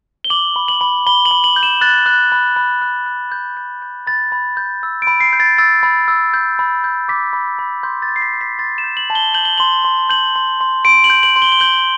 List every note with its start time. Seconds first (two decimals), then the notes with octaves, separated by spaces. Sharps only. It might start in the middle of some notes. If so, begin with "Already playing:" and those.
0.24 G7
0.30 D6 F#7
0.56 B5
0.68 F#7
0.81 B5
1.07 B5 G7
1.25 F#7
1.31 B5
1.44 F#7
1.56 G6
1.63 E7
1.81 F#6 A6
2.06 F#6
2.32 B5
2.56 B5
2.82 F#6
3.06 F#6
3.32 G6
3.57 G6
3.82 G6
4.07 B5 A6
4.32 B5
4.57 G6
4.83 E6
5.02 D7
5.07 B5
5.20 C7
5.33 G6
5.40 A6
5.58 E6 A6
5.83 B5
6.08 E6
6.34 G6
6.59 B5
6.84 G6
7.08 D6 B6
7.33 B5
7.59 B5
7.83 C6 G6
8.02 A6
8.08 G6
8.16 C7
8.22 B6
8.34 G6
8.41 B6
8.59 C6 A6
8.78 E7
8.84 G6
8.97 F#7
9.10 A5
9.15 G7
9.34 G6 F#7
9.45 G7
9.58 C6 F#7
9.85 C6
10.09 G6 F#7
10.36 C6
10.61 C6
10.85 C6 D7
11.04 F#7
11.10 G6
11.23 F#7
11.36 C6
11.42 G7
11.52 G7
11.60 G6 F#7